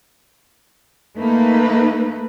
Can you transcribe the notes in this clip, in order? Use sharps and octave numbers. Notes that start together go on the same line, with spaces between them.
A3 A#3 D#4 B4